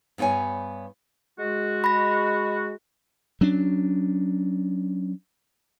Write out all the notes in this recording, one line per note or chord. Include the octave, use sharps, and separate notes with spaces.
G2 B3 G4 C#5 G#5
G#3 F#4
B5 A#6
F#3 C#4 D4